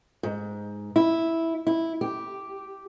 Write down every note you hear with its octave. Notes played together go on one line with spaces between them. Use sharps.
G#2
E4
E4
G4